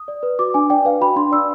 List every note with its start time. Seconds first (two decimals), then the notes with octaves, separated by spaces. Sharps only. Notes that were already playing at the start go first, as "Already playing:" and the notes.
Already playing: D#6
0.08 D5
0.23 B4
0.39 F#4 D6
0.54 D4 G#5
0.70 D5 G5
0.85 B4 F5
1.01 F#4 B5
1.16 D4 C6
1.32 D5 E6